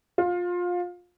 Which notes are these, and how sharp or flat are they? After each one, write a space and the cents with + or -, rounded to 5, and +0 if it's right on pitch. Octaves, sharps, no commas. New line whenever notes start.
F4 +20